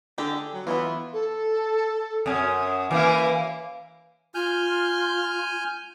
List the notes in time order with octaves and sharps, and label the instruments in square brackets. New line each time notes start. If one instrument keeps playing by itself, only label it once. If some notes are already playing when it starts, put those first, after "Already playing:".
[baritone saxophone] D3 [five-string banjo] G4 G#4
[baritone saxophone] F#3
[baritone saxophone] E3 [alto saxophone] B3 [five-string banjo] E4 F4
[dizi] A4
[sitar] F#2 C#4 [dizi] D#6
[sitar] E3 A#3 E4 [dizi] F5
[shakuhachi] F4 [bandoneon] G#5 F6 G6